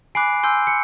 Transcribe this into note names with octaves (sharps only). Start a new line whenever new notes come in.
G#5 B5 D6 F#6 C7 D7
G#5 C6 E6 G6
C#7